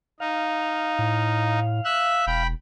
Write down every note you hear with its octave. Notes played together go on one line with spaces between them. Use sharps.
D#4 F5
A2
E5 E6 F#6
E1 G5 B5